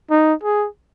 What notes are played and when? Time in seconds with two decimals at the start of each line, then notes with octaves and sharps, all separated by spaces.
0.11 D#4
0.43 G#4